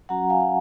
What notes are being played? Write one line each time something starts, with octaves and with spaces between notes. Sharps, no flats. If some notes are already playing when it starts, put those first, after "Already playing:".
F#3 C#4 F#4 F#5 A#5
F5 G#5
F#5